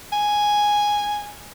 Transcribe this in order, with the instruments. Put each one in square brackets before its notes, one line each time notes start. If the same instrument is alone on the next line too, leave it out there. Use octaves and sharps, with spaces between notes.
[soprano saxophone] G#5